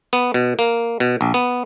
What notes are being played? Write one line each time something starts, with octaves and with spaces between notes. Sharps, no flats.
B3
B2
A#3
B2
A#1
B3